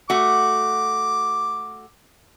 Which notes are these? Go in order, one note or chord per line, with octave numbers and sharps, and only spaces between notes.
A3 F#4 D6